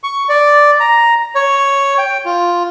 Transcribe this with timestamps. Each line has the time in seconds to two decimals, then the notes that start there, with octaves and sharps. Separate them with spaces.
0.03 C#6
0.29 D5
0.80 A#5
1.35 C#5
1.98 G5
2.25 F4